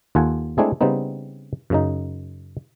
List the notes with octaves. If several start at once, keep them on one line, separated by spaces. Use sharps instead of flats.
D#2 F4 A4 F#5 G#5
G#3 A3 C4 D4 E4 G#4
C#3 G3 B3 C4 D#4
F#2 C#3 D#4